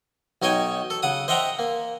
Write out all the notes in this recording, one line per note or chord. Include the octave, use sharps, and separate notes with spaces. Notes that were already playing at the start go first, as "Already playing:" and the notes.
B1 D#4 C#5 G5 G#5
A4
C#3 F#5 D#6
C5 D#5 E5 F#5 G5 A#5
A#3